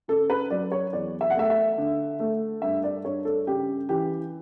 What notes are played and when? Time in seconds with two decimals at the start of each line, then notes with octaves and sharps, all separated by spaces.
0.08 C#3 A4
0.30 B4
0.50 F#3 D5
0.72 C#5
0.93 E2 D5
1.21 E5
1.30 F#5
1.36 A3 E5
1.50 E5
1.78 D3
2.20 A3
2.62 G2 E5
2.84 D5
3.05 G2 C#5
3.25 A4
3.47 C#3 G4
3.89 E3 G4